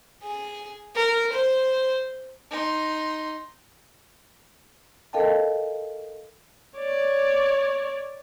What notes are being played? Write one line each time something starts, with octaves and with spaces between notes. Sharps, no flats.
G#4
A#4
C5
D#4 C6
A4 A#4 D#5 F5 G5 A5
C#5 D5